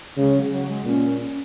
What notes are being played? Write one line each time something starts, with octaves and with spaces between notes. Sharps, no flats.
C#3 G#3
F#3
F#3
G#3
A#2 C#4